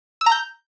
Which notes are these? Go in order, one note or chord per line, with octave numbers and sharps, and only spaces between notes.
E6
A#5
G6